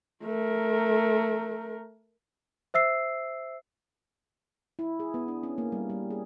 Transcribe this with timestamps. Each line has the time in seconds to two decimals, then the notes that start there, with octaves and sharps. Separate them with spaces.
0.24 A3 A#4
2.74 C5 E5 E6 C7
4.79 E4
5.00 G#4
5.14 B3
5.28 D4
5.43 C#4
5.58 A#3
5.72 G3
5.89 G3
6.10 G#4